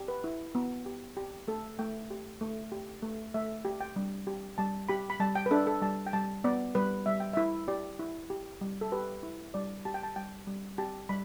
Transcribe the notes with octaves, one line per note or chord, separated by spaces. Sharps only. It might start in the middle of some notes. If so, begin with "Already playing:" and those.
Already playing: G4
B4
E4
B3
G4
G4
A3 A4
A3 G5
G4
A3
G4
A3
A3 E5
G4
G5
G3
G4
G3 A5
G4 B5
B5
G3 A5
G5
B4
D4 A4
A4
G3 A5
G5
G3 A5
B3 D5
G3 B4
G3 E5
G5
E4 E5
G4 D5
E4
G4
G3
A4
G4 B4
E4
G3 D5
G4 A5
G5
A5
G3 G5
G3
G4 A5
G3 B5